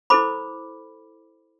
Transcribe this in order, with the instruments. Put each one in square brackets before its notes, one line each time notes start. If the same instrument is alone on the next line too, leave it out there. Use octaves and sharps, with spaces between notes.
[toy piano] E4 A4 C5 B5 D6